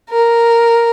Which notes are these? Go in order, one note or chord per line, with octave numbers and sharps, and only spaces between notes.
A#4